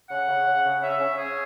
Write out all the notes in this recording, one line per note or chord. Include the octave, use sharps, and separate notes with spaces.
C#3 F#5
C#3
C#3
C#3
C#4 E5
C#4
C#4 G#4